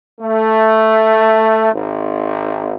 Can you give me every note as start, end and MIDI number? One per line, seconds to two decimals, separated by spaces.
0.20 1.70 57
1.73 2.77 32